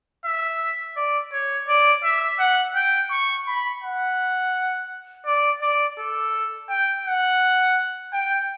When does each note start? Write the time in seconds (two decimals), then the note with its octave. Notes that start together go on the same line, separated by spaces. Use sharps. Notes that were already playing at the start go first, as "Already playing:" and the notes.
0.25 E5
0.97 D5
1.32 C#5
1.68 D5
2.03 E5
2.39 F#5
2.75 G5
3.11 C#6
3.48 B5
3.83 F#5
5.26 D5
5.61 D5
5.98 A4
6.69 G5
7.05 F#5
8.13 G5